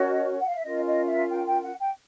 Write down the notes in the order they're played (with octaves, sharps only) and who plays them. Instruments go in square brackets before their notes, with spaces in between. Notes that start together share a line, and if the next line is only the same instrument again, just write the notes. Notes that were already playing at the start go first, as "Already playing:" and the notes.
Already playing: [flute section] C#4 F#4 A#4 C#5 D#5
F#5
F5
E5
C#4 F4 A#4 D#5
D#5
E5
G5
G5
F#5
G5